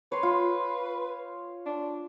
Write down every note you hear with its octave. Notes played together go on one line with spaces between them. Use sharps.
B4 C#5 C6
F4
D4